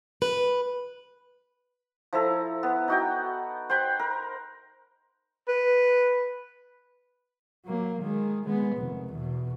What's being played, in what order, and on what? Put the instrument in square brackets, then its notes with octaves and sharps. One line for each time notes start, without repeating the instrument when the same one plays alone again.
[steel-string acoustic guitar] B4
[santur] F3 E4 A4 A#5
B3
D#4 F#4 G5
C5 F#5 G5 B5
A#4
[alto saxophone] B4
[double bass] F#3 A#3
D#3 G#3
G#3 B3
F1 D#3
E2 B2